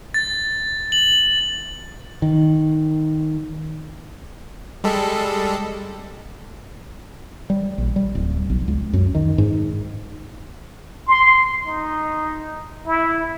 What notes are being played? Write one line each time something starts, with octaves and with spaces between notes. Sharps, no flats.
A6
F#7
D#3
G3 G#3 A4
G3
A#1
G3
D1
B1
C#2
F#2
D#3
G#2
C6
D#4
E4